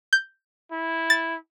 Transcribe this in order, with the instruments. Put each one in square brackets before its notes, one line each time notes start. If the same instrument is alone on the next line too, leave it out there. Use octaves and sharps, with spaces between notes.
[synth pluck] G6
[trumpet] E4
[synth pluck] A6